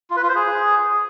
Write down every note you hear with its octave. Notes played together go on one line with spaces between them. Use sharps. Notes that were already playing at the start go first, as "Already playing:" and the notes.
F4
B4
F4
C5
G#4